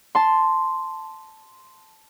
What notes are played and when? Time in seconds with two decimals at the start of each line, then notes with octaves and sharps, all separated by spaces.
0.15 A5 C6